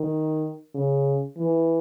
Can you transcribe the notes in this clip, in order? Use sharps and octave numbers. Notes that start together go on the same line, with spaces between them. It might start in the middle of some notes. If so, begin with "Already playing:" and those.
Already playing: D#3
C#3
E3